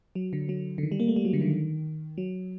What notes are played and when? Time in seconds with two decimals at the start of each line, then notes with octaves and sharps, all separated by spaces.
0.15 F#3
0.33 D3
0.49 F#3
0.78 D3
0.83 D#3
0.92 G3
1.00 A#3
1.08 A3
1.16 G3
1.25 F#3
1.33 D3
1.41 D#3
2.18 F#3